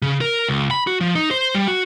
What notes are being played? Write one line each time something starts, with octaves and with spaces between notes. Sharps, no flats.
C#3
A#4
C#2
B5
F#4
F3
D#4
C5
G3
F#4